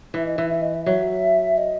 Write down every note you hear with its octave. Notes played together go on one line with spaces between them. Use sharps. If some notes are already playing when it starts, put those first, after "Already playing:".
E3 E5
D#5
E3 E5
E5
D#5
E5
F#3 E5
D#5